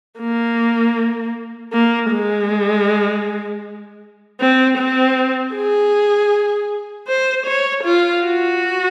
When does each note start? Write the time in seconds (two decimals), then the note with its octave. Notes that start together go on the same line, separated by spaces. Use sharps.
0.20 A#3
1.72 A#3
2.11 G#3
4.40 C4
4.78 C4
5.54 G#4
7.08 C5
7.46 C#5
7.84 F4
8.23 F#4